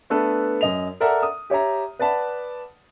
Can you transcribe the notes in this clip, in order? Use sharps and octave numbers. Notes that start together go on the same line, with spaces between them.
A3 B3 D4 A4 B4
F#2 D#5 F7
A4 A#4 D5 E5 F#5 A#5
D#6
G4 C#5 E5 A#5
B4 D5 F#5 A5 B5